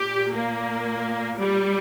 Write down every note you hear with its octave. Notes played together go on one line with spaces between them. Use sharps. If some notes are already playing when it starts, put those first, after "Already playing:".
Already playing: A#2 G4
A#3
G3